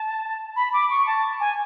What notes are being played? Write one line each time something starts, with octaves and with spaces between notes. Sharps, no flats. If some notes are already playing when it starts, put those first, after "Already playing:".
Already playing: A5
B5
D6
C#6
A5
G#5